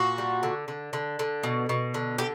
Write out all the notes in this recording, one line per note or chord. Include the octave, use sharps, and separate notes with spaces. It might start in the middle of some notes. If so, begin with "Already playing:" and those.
Already playing: A#2 F#4
G3
D3
D3
D3
D3
B2
B2
D3
D3 G4